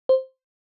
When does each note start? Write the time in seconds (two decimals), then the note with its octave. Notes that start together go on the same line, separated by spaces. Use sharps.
0.09 C5